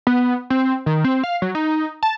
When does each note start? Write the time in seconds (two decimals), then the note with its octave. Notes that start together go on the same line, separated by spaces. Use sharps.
0.07 B3
0.50 C4
0.86 D#3
1.04 C4
1.24 F5
1.42 F#3
1.55 D#4
2.03 A5